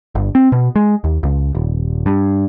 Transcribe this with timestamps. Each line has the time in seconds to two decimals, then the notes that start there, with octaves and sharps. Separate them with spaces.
0.15 G1
0.35 C4
0.52 B2
0.76 G#3
1.04 D#2
1.23 C#2
1.55 D#1
2.06 G2